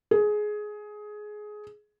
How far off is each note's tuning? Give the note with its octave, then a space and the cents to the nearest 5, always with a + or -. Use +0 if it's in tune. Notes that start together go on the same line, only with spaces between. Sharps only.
G#4 +15